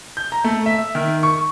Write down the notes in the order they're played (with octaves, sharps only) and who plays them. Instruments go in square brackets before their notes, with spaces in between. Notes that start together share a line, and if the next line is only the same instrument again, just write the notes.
[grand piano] G6
A#5
A3
E5
D#3
C#6